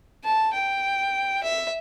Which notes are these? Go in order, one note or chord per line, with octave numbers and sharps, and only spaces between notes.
A5
G5
E5